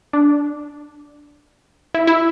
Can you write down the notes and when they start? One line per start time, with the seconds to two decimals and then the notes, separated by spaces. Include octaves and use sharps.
0.13 D4
1.94 E4
2.07 E4